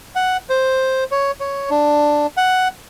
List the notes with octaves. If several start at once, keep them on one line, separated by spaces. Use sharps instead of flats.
F#5
C5
C#5
C#5
D4
F#5